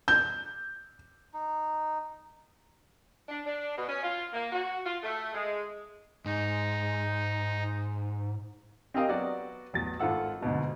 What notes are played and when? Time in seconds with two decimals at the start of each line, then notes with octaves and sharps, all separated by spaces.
0.08 G6
1.34 D#4
3.28 D4
3.45 D4
3.77 B2
3.88 C#4
4.02 F4
4.33 A#3
4.52 F#4
4.85 F4
5.02 A3
5.33 G#3
6.25 G#2 D#4
8.94 C4 G4 A#4 D#5 F5 G5
9.09 F#3 B3 F#4 D5
9.73 A1 E2 F#3 A6
10.00 G#1 F4 A4 F#5 E6
10.41 D2 G#2 B2 F#3